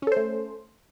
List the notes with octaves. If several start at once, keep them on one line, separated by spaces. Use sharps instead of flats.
A3 C#4 A4 C5